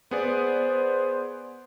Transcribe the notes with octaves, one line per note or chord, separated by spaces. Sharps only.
B3 G#4 C5 D5